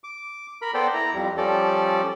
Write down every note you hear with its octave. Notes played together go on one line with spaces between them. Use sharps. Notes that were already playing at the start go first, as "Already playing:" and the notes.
D6
A#4 B5
B3 A4 C5 D5 G5
E4 A#5
F2 G3
F3 G3 C#4 A4 D5